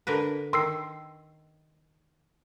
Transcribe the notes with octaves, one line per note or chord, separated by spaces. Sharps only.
D3 A#4 B4
D#3 C6 E6 C7